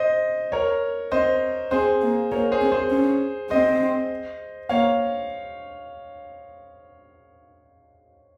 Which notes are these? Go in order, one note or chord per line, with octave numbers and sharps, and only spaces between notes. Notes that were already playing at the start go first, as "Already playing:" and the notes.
Already playing: C5 D#5
A#4 C#5
C4 C5 D#5
C4 G#4 C5
A#3
A#3 A#4 C#5
G#4 C5
C4
G#4 C5
C#4
C4 C5 D#5
A#3 C#5 F5